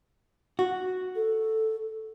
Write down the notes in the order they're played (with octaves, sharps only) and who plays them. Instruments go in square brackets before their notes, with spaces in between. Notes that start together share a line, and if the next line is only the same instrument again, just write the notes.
[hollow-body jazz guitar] F#4
[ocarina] A4